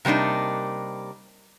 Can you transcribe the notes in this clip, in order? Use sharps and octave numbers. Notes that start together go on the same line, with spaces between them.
C3 G3 A#3 D4 D#4